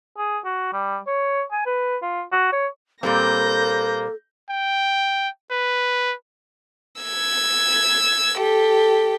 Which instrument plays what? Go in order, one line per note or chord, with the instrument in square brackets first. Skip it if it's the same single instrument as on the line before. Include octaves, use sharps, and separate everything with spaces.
[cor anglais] G#4
F#4
G3
C#5
G#5
B4
F4
F#4
C#5
[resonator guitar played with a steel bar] A#2 G3 C4 [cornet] A#3 [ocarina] A4 [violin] G6 A#6
[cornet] G5
B4
[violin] E6 G#6
G4 A4